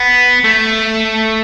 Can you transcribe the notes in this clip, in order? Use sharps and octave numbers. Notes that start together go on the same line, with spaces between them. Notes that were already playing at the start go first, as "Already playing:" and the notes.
Already playing: B3
A3